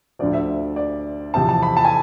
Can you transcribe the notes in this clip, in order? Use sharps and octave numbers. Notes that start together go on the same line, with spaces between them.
D2 D3 F3 D5
E5
D5
E2 C3 F3 A5
A5
B5
A5
G#5